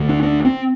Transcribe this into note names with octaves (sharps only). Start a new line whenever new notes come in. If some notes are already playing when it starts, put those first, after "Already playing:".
Already playing: D2 D3
D4
D4
C4